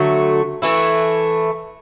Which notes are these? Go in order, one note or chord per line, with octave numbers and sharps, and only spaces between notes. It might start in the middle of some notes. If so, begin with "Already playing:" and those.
Already playing: D3 F#3 A3
E3 A3 E4